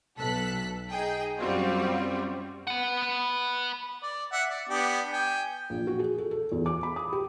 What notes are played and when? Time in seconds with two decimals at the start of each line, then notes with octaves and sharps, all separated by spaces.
0.18 B1 A4 F#6 B6
0.91 D#4 G#4 G5
1.38 F#2 G3 C4 F4 F#4
2.67 B4 F#5
4.03 D5
4.32 E5 F#5
4.50 D5
4.69 B3 D4 G4
5.13 G5 G#5
5.70 A#1
5.87 F#4
6.00 G#4
6.18 A4
6.31 A4
6.52 E2
6.66 D6
6.83 B5
6.96 D#6
7.12 G4